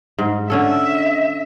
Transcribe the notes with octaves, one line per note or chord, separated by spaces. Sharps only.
G#2
D3 C#4 A4 E5